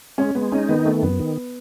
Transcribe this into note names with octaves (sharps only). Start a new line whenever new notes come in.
G#3 C#4
G#3 B3
C#4 D#4
D#3 B3
A3 B3
F#2 B3
D#3